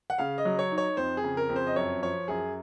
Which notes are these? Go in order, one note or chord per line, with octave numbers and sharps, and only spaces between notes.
F#5
C#3 F5
D#5
F#3
C#5
D#4
C#5
F2 C5
G#4
C#3
A#4
F2
C5
D#5
F#2 C#5
F3 C#5
F#2 G#4